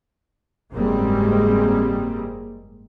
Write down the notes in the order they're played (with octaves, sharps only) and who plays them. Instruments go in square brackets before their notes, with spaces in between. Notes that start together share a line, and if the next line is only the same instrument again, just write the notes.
[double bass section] F#1 G#2 G3 G#3 A#3 C4